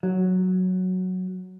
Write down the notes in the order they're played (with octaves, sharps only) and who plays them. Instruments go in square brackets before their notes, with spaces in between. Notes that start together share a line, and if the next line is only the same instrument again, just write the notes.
[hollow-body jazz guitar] F#3